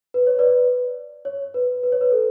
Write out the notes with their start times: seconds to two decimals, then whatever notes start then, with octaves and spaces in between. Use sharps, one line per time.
0.14 B4
0.27 C#5
0.39 B4 D5
1.25 C#5
1.54 B4
1.83 B4
1.92 C#5
2.01 B4
2.12 A4